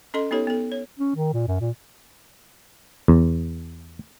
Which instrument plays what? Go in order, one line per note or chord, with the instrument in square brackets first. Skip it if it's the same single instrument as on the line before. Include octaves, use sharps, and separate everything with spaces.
[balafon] C#4 A4 D#5 C6
B3 D#4 G4 A4 C#5
B3 A4
C#5
[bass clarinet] C#4
D#3
A#2
F#2
A#2
[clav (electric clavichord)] E2